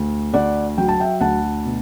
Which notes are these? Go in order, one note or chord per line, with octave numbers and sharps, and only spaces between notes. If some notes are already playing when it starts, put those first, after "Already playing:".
Already playing: D2
D2 D5 F#5
F#3 G5
A5
E5 G5
D2 F#5 A5
B2